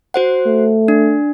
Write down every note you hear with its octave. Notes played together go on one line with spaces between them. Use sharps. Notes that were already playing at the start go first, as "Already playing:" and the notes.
F#4 C5 F#5
A3
D4